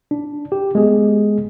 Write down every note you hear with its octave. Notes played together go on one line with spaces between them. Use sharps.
D4
G4
G#3 B3 G#4